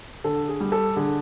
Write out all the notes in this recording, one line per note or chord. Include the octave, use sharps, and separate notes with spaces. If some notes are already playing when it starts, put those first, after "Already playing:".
D3 A4
G#4
G3
A4
D3 G#4